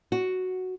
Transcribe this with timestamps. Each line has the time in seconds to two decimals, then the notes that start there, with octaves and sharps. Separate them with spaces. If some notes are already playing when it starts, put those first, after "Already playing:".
0.12 F#4